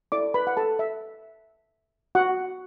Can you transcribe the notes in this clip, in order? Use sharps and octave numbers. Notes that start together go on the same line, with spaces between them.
E4 A4 D5 D6
B4 B5
F#5
A4 A5
E5
F#4 F#5